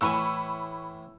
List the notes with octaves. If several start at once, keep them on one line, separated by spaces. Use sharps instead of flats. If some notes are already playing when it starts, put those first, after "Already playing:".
A2 E3 G#5 B5 C#6 E6